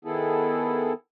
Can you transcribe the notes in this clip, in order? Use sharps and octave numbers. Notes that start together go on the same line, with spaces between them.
D#3 B3 E4 G#4 A4